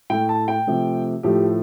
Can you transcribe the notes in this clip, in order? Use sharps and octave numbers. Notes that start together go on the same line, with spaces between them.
A2 A3 G5
A5
G5
C3 F3 A3
A2 F3 A3 G4